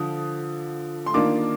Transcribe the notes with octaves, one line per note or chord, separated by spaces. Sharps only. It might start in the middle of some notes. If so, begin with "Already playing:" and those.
Already playing: D3 F3 D#6
C6
D#3 A#3 D4 F4 D6